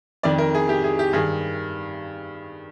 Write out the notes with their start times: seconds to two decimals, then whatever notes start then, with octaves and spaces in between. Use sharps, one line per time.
0.23 F2 D#3 D5
0.38 A#4
0.54 G#4
0.69 G4
0.84 G#4
0.99 G4
1.13 G2 D#3 G#4